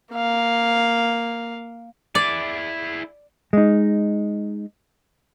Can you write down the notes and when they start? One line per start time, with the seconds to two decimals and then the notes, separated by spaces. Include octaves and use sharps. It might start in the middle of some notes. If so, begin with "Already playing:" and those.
0.13 A#3 F5
2.15 E4 G#4 D5
3.53 G#3 D#4